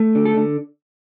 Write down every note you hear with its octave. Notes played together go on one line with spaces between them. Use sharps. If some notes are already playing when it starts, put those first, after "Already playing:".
Already playing: A3
D3
A4
D3